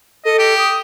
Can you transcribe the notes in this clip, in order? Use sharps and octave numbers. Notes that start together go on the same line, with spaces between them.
A4 D#5
G4
D#6